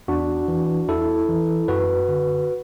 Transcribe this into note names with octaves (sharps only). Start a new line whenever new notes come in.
E2 D4 F#4
E3
E2 E4 A4
E3
F#2 F#4 B4
D3